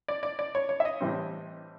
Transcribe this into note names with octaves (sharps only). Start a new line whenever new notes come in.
D5
D5
D5
C#5
C#5
E5
D#5
A2 E3 G3 C4